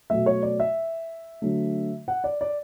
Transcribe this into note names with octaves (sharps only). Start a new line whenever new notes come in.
B2 F#3 A3 E5
C#5
D5
E5
D3 F#3 A3
F#5
D5
D5